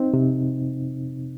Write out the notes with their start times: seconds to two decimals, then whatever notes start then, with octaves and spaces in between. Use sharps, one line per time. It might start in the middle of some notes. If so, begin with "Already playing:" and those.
Already playing: C4 D#4
0.14 C3